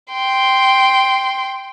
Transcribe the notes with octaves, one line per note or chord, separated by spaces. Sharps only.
G5 C6